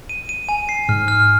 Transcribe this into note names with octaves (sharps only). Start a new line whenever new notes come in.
D#7
D#7
G#5
C7
G#2 F6
F6